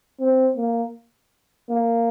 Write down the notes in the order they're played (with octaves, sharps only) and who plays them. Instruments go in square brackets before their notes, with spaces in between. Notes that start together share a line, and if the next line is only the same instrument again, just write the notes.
[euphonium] C4
A#3
A#3